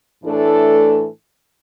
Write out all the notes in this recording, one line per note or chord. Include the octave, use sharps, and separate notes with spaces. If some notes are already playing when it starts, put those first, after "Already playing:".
A2 E3 A3 D4 A4